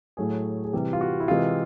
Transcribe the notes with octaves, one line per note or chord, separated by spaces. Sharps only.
A2 F#3 A3 G#4
G#4
C3 E3 G3 G4
F4
F#4
E4
C3 E3 G#3 F4